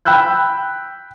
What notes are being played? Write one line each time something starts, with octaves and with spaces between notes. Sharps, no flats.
G5 B5 E6 F#6 G6